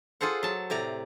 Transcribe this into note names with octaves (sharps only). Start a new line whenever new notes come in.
F4 G#4 A4 C5 F#5
F#3 A5
A2 C3 D5 A#5